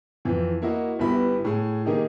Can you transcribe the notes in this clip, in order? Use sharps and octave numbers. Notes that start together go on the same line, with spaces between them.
F2 E3 C4
A#3 E4 F#4 D#5
G1 G3 B3 E4 B5
A2 G#4
D#3 A#3 D#4 G4 G#4